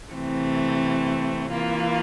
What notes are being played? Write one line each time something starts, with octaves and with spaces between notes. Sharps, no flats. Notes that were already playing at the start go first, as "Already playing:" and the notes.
C3 E3 A3 C4
E3 A#3 F4